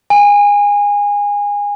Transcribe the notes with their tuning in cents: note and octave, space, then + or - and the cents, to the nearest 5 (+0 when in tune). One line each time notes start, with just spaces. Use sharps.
G#5 -25